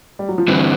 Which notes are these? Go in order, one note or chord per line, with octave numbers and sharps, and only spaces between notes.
G3
F#3
F3
G2 D3 E3 G3 C4